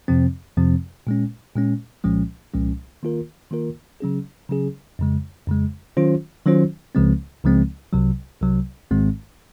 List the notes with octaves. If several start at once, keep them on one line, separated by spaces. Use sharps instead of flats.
F2 C3 F3 C4
F2 C3 F3 C4
A#2 G#3 C#4
A#2 G#3 C#4
C2 A#2 F3 G#3 C#4
C2 A#2 F3 G#3 C#4
D#3 A#3 F4 A#4
D#3 A#3 F4 A#4
C#3 F#3 C#4 G#4
C#3 F#3 C#4 G#4
F2 C#3 G#3
F2 C#3 G#3
D#3 F#3 C#4 F4 C5
D#3 F#3 C#4 F4 C5
C#2 C#3 F3 G#3 C4
C#2 C#3 F3 G#3 C4
C2 C3 F#3
C2 C3 F#3
G#1 G#2 D#3 G#3 C4